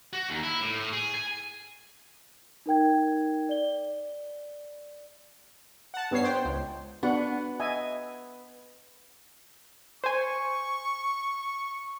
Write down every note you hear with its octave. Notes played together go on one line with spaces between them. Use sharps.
F#4
D#2
E4
A2
A2
G#4
G#5
D#4 A#4 G5 G#6
D5 G7
F#5 A5
G2 B3 C#5 C7
C5 G5
C#2
B3 D4 F#4 F#5
D#5 E5 G#5
C5 G#5 C#6